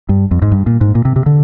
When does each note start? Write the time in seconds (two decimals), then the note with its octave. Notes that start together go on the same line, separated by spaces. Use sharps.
0.09 G2
0.31 F2
0.42 G#2
0.52 G2
0.66 A#2
0.81 G#2
0.95 A#2
1.05 C3
1.16 C3
1.26 D3